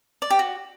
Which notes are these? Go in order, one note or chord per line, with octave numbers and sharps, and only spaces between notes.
D5
G4
F#4